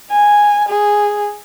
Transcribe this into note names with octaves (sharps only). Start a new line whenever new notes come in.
G#5
G#4